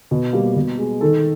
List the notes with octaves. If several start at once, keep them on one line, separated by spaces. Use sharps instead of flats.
B2
G3 A#3
B2
G#3
D#3 A4